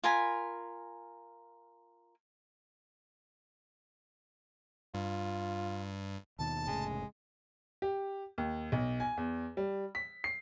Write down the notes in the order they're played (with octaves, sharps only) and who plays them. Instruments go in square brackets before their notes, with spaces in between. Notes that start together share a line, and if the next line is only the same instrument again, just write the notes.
[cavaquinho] F4 A#4 G#5 B5
[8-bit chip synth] G2 [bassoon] F4
[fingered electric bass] D#2 B2 D#3 [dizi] A5
[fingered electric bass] F1 A2 C#3 [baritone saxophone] G#3
[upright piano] G4
D#2
B1
G#5
E2
G3
B6
C7